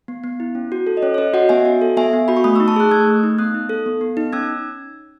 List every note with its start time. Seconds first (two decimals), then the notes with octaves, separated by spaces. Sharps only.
0.08 B3
0.24 B3
0.40 E4
0.55 C#4
0.72 F#4
0.87 A4
0.97 D#5
1.02 C#4 C#5
1.14 C#5
1.18 C#4 B4 D#5
1.34 F#4 D#5 F#5
1.49 B3 E5 G#5
1.65 F#4
1.82 A4
1.97 B3 E5 G#5
2.13 B3
2.28 F#4 B5
2.37 C#6
2.44 A3 B5 D#6
2.56 C#6 E6
2.60 D#4
2.68 A5 C#6
2.76 G#4 D#6 F#6
2.91 A3 E6 G#6
3.07 A3
3.23 D#4
3.38 B3 D#6 F#6
3.54 D#4
3.69 A4
3.86 B3
4.01 B3
4.17 D#4
4.33 C#4 E6 G#6